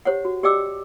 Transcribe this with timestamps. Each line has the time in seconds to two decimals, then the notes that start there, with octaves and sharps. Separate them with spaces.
0.05 G4 C5 C#5 F#5
0.25 F#4
0.43 G4 D5 D#5 G5 D6 E6